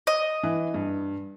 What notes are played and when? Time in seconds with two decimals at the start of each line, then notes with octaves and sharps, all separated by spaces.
0.07 D#5
0.43 E3
0.74 G2